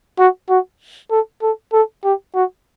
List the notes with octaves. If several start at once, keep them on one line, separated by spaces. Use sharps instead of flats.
F#4
F#4
A4
A4
A4
G4
F#4